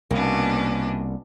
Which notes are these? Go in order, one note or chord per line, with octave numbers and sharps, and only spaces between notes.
C2 B2 A#3 C#4 D4